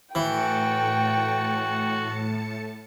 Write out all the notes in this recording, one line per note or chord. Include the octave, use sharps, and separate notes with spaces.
A2 E3 F#4 G5 A5 C#7